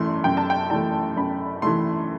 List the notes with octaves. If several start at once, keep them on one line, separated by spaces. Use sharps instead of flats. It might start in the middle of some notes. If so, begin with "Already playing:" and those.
Already playing: F#2 E3 A3 C6
F#2 G5
A5
G5
E3 A3 A5
F#2 B5
E3 A3 C6